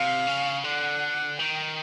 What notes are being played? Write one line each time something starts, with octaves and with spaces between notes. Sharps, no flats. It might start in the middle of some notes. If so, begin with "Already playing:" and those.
Already playing: C3 F5
C#3
D3 F#5
D#3 G5